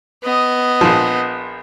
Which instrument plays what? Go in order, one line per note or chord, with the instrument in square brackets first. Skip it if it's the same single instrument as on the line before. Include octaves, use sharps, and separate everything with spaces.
[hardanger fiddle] B3 D#5
[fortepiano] A#1 F3